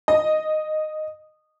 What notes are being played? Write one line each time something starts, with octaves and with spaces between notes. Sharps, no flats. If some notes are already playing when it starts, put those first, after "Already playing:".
D#5